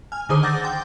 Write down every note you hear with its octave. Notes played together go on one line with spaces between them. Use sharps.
G#5 F6
D3 D#3 G#4 C5 D#6
F#5 D6 E6 G6 A6 A#6
G5 C6